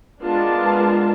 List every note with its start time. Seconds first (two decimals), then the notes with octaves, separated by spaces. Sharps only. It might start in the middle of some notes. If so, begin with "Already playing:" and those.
0.22 G#3 B3 D4 F4 A#4 A5